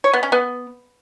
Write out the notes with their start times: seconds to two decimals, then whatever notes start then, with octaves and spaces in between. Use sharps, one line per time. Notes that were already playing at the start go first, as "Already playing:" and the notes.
0.04 C#5
0.13 B3
0.23 C#4
0.32 B3